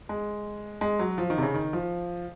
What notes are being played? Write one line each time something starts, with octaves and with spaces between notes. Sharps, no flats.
G#3
G#3
F#3
F3
D#3
C3
C#3
D#3
F3